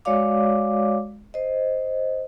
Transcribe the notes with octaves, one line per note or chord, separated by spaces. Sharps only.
G#3 F#4 C#5 D5 F5 D6
C5 D#5